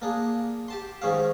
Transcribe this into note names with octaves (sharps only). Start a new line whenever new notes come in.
A#3 D4 G#4
G4 A5 C6
G#2 D#3 C#4 G#4 F5